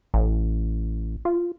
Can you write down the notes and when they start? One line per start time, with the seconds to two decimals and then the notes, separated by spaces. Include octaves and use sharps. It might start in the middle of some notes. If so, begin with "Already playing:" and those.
0.14 A1
1.25 F4